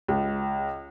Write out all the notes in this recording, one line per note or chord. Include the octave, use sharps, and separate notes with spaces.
C#2